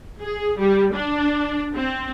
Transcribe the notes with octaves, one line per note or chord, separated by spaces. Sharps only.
G#4
G3
D4
C4